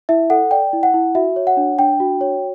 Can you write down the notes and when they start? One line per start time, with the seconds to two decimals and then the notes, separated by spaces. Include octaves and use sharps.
0.09 E4 E5
0.30 A4 F#5
0.51 D5 G5
0.73 E4
0.83 F#5
0.94 E4
1.15 F#4 E5
1.36 C#5
1.47 F#5
1.57 D4
1.79 D4 G5
2.00 F#4
2.21 C#5